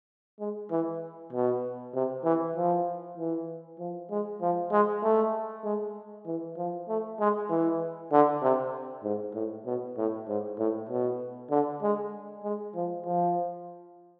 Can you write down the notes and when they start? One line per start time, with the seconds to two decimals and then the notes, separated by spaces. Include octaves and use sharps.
0.40 G#3
0.71 E3
1.32 B2
1.94 C3
2.25 E3
2.56 F3
3.18 E3
3.79 F3
4.11 G#3
4.41 F3
4.72 G#3
5.03 A3
5.64 G#3
6.26 E3
6.57 F3
6.89 A3
7.20 G#3
7.50 E3
8.12 D3
8.42 C3
9.04 G#2
9.34 A2
9.66 B2
9.97 A2
10.28 G#2
10.58 A2
10.89 B2
11.51 D3
11.82 G#3
12.44 G#3
12.75 F3
13.05 F3